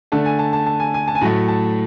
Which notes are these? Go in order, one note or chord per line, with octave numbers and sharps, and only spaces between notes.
D3 A3 D4 A5
G#5
A5
A5
A5
G#5
G#5
A5
G#5
A2 F#3 A3 A5
A5